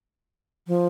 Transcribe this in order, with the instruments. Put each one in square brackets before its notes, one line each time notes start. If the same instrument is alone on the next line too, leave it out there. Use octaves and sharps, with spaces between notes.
[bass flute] F3